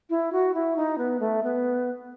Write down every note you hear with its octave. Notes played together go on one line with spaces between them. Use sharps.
E4
F#4
E4
D#4
B3
A3
B3